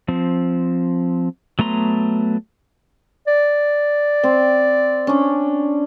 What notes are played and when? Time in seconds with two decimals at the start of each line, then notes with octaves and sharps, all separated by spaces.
0.08 F3 C4
1.59 F#3 A3 B3 A#5 C6
3.27 D5
4.24 C4
5.07 C#4 D4